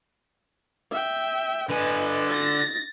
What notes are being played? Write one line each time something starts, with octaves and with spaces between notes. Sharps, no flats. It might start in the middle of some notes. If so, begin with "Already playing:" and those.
E5 G5
D3 B4 D#5 G#5
A6 A#6